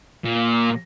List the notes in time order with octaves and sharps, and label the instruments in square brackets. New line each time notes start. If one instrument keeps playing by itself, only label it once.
[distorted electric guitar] A#2